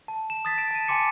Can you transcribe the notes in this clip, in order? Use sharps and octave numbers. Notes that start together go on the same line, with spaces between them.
A5
E7
D#6 A6 B6
D7 E7
A5 D#7
G#5 A5 C6 D6 C#7 D#7